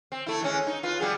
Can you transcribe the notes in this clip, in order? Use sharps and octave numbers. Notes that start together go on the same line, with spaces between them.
C4
A3 E4
E3 G#3 C#4
D#4
F4 B4
G3 B3 G#4